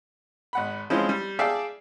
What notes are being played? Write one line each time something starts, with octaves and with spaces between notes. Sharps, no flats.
G#1 F#5 B5
E3 F3 G#3 C4 C#4 E4
G3
G#4 D5 E5 F5 G5 A5